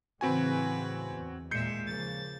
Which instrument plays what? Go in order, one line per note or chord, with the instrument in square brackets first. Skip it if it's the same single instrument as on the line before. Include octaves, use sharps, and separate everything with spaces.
[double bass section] A2 C#3 E3 [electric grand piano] C4 F#4 G#5 [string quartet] B4
[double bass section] E2
[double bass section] D#2 A#2 [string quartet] G#3 E5 [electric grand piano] G6 C7 C#7
[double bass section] C#3 F3 A#3 [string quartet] A6